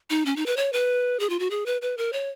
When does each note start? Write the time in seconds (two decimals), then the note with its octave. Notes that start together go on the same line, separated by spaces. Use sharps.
0.10 D#4
0.26 C#4
0.36 D#4
0.46 B4
0.57 C#5
0.73 B4
1.20 G#4
1.30 F4
1.39 F#4
1.50 G#4
1.66 B4
1.82 B4
1.97 A#4
2.13 C#5